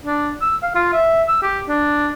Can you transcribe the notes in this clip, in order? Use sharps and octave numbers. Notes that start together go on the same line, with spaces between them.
D4
E6
F5
F4
E5
E6
G4
D4